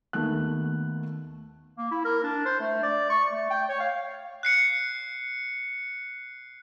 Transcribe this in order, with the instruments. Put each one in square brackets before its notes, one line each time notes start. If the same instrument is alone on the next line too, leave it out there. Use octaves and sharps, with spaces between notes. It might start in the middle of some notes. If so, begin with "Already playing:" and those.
[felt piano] D#2 A3 B3 F#6
[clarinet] A#3
E4
A#4
D4
C5
A3
D5
C#6
A3
G5
C#5
F5
[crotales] F#6 C7 C#7